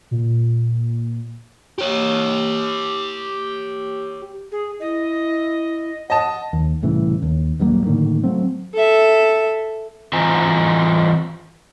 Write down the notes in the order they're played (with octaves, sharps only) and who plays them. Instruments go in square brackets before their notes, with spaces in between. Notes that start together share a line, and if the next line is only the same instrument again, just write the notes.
[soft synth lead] A#2
[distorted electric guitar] G4 C#5
[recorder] G#4
[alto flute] E4 [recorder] D#5
[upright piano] D#5 A5 [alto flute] F#5
[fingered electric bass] D#2
C2 A2 C#3 E3
D#2
D#1 G2 F#3 A#3
A2 D3 D#3 A#3
F#3 A3 C4
[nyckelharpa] A4 E5
[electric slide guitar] E3 C4 F4 D#5 G#5 A#5